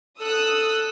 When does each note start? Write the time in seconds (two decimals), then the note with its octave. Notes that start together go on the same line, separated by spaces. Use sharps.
0.20 A4 D#6 E6 F#6